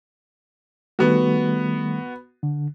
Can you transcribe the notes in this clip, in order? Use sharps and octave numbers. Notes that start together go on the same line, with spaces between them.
D#3 G3 A3 B3 F#4
D3